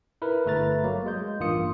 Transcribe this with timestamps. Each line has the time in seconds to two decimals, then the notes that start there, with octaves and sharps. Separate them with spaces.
0.22 E4 A#4 B4
0.46 G1 A3 B4 A#5 A6
0.84 F#3 A#3
1.06 G#3 G6
1.40 A1 G2 A#3 F4 D#6 C#7